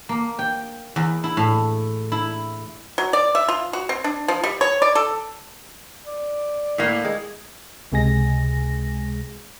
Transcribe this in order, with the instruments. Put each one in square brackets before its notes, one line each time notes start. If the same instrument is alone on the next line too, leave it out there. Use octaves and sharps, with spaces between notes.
[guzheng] A#3
G5
E2
E4
A2
E4
[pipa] F#3
D5
E5
F4
F#4
C4
D4
F3
G3
C#5
D5
A4
[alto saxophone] D5
[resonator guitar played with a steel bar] A2 A#3
G#3
[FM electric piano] C#2 C3 G#3 G#4 G#5 A#6